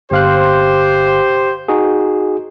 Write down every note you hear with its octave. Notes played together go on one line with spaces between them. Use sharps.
G1 G4 C5 F5 F#6
D#4 F#4 G#4